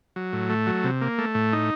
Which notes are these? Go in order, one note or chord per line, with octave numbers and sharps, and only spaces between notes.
F#3
A2
A3
F#3
C3
A#3
A3
A2
D#4